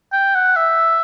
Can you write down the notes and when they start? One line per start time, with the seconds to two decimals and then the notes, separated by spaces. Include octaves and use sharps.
0.13 G5
0.35 F#5
0.56 E5